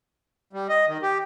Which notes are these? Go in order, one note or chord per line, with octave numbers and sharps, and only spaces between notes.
G3
D#5
D#3
G4